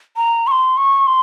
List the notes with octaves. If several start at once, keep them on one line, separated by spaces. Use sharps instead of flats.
A#5
C#6
C6
C#6
C6